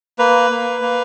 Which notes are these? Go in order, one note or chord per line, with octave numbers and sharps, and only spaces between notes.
A#3 B4
A#3
A#3